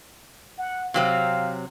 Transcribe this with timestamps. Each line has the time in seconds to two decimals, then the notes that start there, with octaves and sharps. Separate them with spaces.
0.58 F#5
0.94 C3 F#3 C4 F5